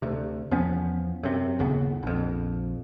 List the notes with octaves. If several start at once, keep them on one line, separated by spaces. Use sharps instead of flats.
D2 C3
E2 F3 B3 C#4
F#2 C3
G1 D#2 C#3 B3
A#1 F2